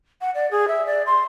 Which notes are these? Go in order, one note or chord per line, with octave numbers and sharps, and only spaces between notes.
F#5
D5
G#4
E5
D5
C6